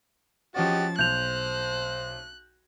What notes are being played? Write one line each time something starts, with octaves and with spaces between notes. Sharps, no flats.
F3 C#4 F#4 G4 D#5 A6
B1 C5 F#6 G6 F7